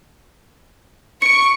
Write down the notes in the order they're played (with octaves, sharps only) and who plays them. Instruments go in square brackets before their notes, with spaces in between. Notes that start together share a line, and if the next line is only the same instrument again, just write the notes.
[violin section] C#6 [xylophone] C#7 D7